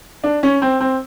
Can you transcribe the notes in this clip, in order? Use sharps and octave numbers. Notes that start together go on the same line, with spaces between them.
D4
C#4
C4
C4